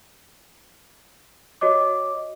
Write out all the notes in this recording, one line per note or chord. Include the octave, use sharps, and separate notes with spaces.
F#4 C#5 D#5 D6